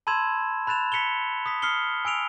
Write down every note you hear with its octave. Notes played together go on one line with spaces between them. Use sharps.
A5 B5 C6 E6 G#6 E7
B5 F#6 A6 E7 F7
B6 C#7 F7 G7
D#6 B6
D#6 F6 C7 C#7 G7
G#5 E6 D7 F7